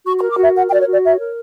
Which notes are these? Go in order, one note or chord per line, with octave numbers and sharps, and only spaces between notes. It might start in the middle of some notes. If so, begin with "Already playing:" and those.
F#4 C#6
C#6
A#4
D6
F#4 E5
A#4 F#5
G5
F#4 D5
C#5
F#4
D5
C#5 E5
A#4